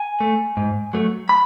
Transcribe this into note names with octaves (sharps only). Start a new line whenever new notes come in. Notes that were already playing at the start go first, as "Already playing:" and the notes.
Already playing: G#5
A3
G#2
F#3 A3
B5